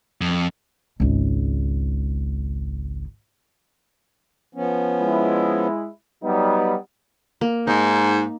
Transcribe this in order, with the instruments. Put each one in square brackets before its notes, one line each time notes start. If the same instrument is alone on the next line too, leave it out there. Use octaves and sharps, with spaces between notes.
[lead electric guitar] F2
[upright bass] G#1 C#2
[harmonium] F3 B3 C#4
[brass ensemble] G#3 E4
[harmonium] F#3 [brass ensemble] G3 B3 D#4
[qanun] A#3
[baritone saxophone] G#2 [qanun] D#4